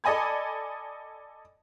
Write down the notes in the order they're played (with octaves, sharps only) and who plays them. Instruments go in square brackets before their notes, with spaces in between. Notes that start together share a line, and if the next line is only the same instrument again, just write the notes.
[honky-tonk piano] A4 D5 D#5 G#5 B5 G#6